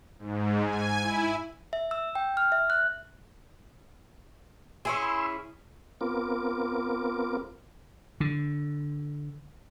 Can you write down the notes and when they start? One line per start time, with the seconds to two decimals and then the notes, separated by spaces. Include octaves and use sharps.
0.19 G#2
0.66 G#5
1.01 E4
1.73 E5
1.91 E6
2.15 G5
2.37 F6
2.52 E5
2.70 F#6
4.85 C#4 E4 G#4 C6 E6
6.01 B3 C4 F4 A#4 D6
8.20 D3